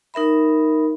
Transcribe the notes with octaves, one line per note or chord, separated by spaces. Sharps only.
D#4 A#4 E5 B5